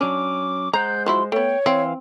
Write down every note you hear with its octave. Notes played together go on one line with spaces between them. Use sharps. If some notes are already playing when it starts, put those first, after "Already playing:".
F#3 C#4 D4 D6
G#3 C5 F#5 A#5 G6
F3 F#3 E4 C6
A3 B3 C#5 G5
E3 C4 F5 C6